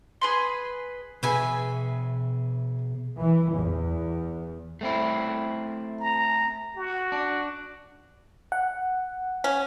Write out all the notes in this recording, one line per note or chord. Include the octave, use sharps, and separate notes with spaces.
G#4 B4 C6
B2 G#4 B4 E5 G#5
E3
E2
A3 C4 E4
A#5
F#4
D4
F#5
C#4